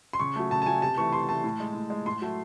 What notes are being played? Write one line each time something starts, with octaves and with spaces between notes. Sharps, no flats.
C6
C#3 C#6
F#3 A3
C#3 A5
A5
F#3 A3 G#5
C3 A5
E3 A3 C#6
C3 C6
E3 A3 A5
A2
G#3
A2
G#3
A2 C6
F#3 A3